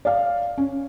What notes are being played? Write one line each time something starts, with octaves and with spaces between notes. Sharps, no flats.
D5 F5
C#4